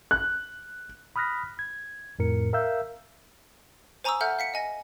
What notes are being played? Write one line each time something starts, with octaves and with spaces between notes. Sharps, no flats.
F#6
B5 D#6 F6 F#6 A#6 B6
G#6
F2 A2 A#4 C#7
A#4 E5 F5 E6 G6
C5 G#5 A#5 C#6 D#6 E6
A4 E5 F#5 F6 G6
F5 B6 C#7
D#5 G#5 A#6